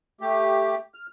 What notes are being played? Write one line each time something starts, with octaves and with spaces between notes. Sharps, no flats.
A3 G4
F6